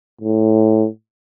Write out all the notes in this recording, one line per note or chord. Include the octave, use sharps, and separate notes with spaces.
A2